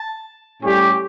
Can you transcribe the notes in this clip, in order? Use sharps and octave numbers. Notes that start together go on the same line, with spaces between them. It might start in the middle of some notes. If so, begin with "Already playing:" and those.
Already playing: A5
A2 G3 C#4 G4